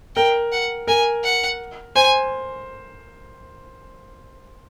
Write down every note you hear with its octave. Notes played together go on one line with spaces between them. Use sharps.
A#4 G5
F#5
A#4 G#5
F#5
C5 G#5